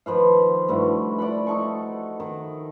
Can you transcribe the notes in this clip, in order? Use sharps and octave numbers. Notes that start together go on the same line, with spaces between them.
D#3 F3 B4 F5
G2 A3 E4 F#4
D5 F#5 B5
D#4 A4 C#6
D#3